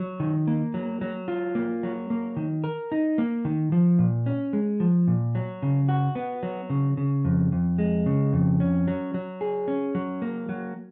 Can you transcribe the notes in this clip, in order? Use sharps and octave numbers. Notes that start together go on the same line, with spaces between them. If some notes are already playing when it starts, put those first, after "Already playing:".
Already playing: F#3
D#3
A#3
F#3
F#3
F4
A#3
F#3
A#3
D#3
A#4
D#4
A#3
D#3
F3
A#2
C#4
G#3
F3
A#2
F#3
C#3
F#4
B3
F#3
C#3
C#3
F2
F2
G#3
C#3
F2
C#4
F#3
F#3
G#4
C#4
F#3
A#3
F#3